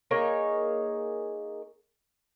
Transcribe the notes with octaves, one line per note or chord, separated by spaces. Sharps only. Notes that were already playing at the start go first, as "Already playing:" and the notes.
A#3 D#4 G#4 C#5